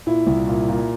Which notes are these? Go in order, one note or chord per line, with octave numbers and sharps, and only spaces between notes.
A#2 E4
C2
A#2
A#2